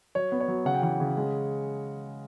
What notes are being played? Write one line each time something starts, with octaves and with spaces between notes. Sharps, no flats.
F#3 C#5
B3
C#5
F#3
C#3 F#5
G5
E3 F#5
C#3
G#3